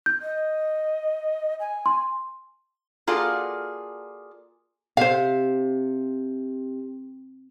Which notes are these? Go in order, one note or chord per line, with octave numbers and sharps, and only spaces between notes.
G6
D#5
G#5
C6
A#3 F4 F#4 G#4 A4 D5
C3 C5 F5